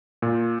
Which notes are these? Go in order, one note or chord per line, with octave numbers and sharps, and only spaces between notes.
A#2